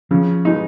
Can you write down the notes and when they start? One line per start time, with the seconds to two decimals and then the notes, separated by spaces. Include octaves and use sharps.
0.11 C#3 F3
0.45 G#3 D#4